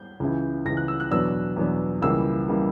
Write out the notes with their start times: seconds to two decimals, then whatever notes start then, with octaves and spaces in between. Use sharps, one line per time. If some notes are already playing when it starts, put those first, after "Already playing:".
Already playing: G6
0.20 C#2 C#3 E3
0.66 C#2 C#3 E3 A#6
0.77 F#6
0.88 E6
1.00 F#6
1.11 E2 B2 F#3 B3 D4 E6
1.56 E2 B2 F#3 B3 D4
2.02 C#2 C#3 E3 G3 A#3 E6
2.48 C#3 E3 G3 A#3